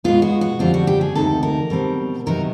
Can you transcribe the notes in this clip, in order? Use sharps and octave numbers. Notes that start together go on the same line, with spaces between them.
B2 G#3 B3 F4
F#4
F#4
F2 D3 G3 C4 F4
F#4
G4
G#4
D2 C3 D#3 A4
A#4
B2 G3 C4
C3 D#3 F#3 B3 A#4